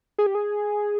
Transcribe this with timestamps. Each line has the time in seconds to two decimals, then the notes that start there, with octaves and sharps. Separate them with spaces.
0.18 G#4
0.26 G4
0.35 G#4